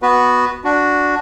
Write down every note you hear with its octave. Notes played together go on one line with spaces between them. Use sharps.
B3 F#4 B4
D4 F#4